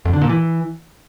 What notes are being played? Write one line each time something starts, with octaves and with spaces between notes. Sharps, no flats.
F2
D3
A#2
E3